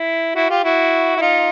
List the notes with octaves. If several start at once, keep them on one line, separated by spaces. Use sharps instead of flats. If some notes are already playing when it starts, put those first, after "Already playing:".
Already playing: E4
E4 F#4
F4 G4
E4 F#4
E4
D#4 F4